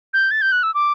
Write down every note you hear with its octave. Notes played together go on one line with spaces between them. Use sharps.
G6
A6
G6
F#6
E6
D6